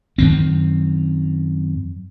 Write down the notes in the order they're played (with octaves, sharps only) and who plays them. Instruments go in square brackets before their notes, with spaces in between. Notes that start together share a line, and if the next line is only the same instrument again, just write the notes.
[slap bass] F#2 D#3 C4